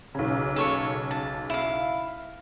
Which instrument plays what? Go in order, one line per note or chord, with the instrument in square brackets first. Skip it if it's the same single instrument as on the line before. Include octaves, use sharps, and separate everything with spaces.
[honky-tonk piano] B1 C#3
[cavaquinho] A4 C#5 C#6
A5
E4 F5